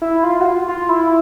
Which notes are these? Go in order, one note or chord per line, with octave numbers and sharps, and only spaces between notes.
E4
F4
F#4
F4
F4
E4